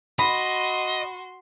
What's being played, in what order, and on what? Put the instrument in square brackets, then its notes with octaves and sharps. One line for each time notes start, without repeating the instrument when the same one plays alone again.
[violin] F#4 C6 [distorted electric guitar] D#5 [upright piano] B5